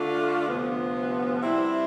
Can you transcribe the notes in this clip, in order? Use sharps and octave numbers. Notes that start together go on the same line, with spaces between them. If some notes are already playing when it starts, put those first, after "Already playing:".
Already playing: D3 A3 D4 F4
D2 C3 F3 B3
C3 G3 C4 E4